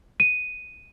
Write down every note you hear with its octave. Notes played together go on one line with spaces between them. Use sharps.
D#7